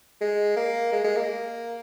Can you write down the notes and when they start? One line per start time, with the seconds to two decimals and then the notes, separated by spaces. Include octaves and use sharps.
0.21 G#3
0.56 A#3
0.92 G#3
1.04 G#3
1.16 A#3